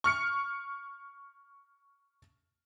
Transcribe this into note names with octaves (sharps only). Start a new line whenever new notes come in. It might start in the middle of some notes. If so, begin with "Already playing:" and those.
C#6 F6 C#7